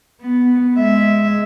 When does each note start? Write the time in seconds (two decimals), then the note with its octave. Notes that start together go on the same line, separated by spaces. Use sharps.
0.21 B3
0.76 G#3 E5